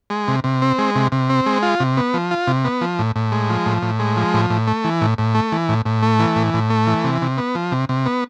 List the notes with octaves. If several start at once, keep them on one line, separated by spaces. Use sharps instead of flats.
G#3
C3
C3
C4
G#3
C3
C3
C4
G#3
F4
C3
B3
F3
F4
C3
B3
F3
A2
A2
G#3
F3
A2
A2
G#3
F3
A2
A2
A3
E3
A2
A2
A3
E3
A2
A2
A3
E3
A2
A2
A3
E3
C3
C3
B3
F3
C3
C3
B3